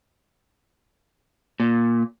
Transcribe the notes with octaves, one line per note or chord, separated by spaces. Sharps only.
A#2